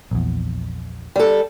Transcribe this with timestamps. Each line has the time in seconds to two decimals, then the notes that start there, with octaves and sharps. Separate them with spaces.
0.11 A#1 E2
1.16 G3 A4